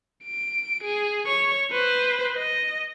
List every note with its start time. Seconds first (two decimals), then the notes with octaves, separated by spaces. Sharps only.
0.25 D7
0.83 G#4
1.26 C#5 C#6
1.72 B4 C5
2.35 D#5